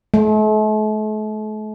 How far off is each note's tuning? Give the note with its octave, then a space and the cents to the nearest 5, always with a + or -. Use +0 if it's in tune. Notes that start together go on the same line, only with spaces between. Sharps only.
A3 -40